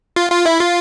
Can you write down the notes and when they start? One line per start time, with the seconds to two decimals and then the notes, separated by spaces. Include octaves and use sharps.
0.16 F4
0.31 F4
0.46 E4
0.60 F4